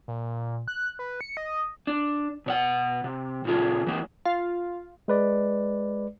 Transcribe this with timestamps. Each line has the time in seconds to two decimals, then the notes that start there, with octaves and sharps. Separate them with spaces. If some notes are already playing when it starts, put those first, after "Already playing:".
0.08 A#2
0.68 F#6
0.99 B4
1.21 C#7
1.37 D#5
1.87 D4
2.46 B2 C#5 F#5
3.04 C3
3.45 A#2 C#3 E4 F4 G#4
3.87 E3 A#3
4.25 F4
5.08 G#3 B4 D5